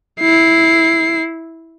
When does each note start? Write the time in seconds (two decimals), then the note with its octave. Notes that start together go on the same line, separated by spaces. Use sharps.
0.20 E4 C7